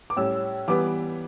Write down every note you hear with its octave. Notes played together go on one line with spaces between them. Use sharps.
D6
A2 G3 C#4 E6
E3 G3 B3 D6